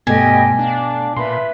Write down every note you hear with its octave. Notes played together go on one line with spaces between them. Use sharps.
G2 B2 A3 G4 D#5 G5 G#5
D4 F5
A#2 B4 E5 B5 C6